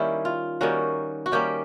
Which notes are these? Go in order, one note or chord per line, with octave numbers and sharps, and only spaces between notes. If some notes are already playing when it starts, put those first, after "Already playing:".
Already playing: D#3 G3 A#3 C#4 E4
F4
D#3 G3 A#3 C#4 F#4
F#4
D#3 G3 A#3 C#4 G4